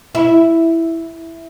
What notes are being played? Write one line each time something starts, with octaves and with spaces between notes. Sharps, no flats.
E4